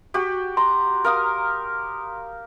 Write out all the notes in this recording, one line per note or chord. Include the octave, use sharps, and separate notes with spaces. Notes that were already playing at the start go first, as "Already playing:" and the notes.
F#4 G4
A#5 C6
A#4 F5 D#6